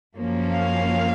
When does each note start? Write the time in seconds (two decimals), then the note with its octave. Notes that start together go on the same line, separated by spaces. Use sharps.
0.16 F#2 F3 A#3 C#4
0.52 F5